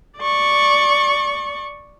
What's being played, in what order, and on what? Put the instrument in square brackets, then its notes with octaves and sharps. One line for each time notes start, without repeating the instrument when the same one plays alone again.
[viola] D5 C#6